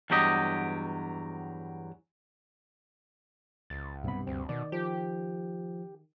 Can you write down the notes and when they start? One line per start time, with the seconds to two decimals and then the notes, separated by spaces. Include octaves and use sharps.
0.10 E2 G2 F#3 G4 D#5
3.70 C#2 A6
4.04 B1 G2 C3 B3 B5
4.27 D2 C4
4.49 B2 D#3 D5
4.72 F3 G4